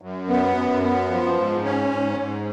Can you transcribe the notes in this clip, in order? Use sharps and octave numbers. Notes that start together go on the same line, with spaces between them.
F#2
B3
F#2
B3
F3
G#2
C#4
G#2
G#2